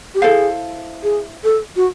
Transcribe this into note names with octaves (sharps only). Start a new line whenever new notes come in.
G4
E4 G#4 A4 C5 F5
G#4
A4
F#4